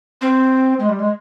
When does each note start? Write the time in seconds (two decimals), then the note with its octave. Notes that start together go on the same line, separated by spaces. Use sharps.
0.21 C4
0.80 G#3
0.89 G3
0.99 G#3